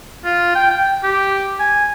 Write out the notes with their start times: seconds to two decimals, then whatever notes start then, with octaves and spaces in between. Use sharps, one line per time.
0.25 F4
0.55 G5
0.71 G5
1.04 G4
1.60 G#5